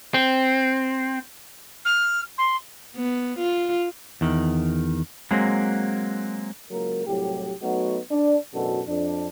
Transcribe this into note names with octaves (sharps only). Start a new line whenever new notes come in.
C4
F6
C6
B3
F4
E2 D#3
F#3 G#3 A#3 C4
C#2 F#3 A#3 A#4
C2 A2 F#3 G4
F#3 A3 B3 D#4 F#4
D4
A1 F#2 B2 D4 F#4 A4
F2 D4